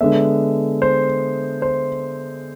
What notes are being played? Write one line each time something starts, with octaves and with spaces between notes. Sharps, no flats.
D3 G#3 B3 E5
C5
C5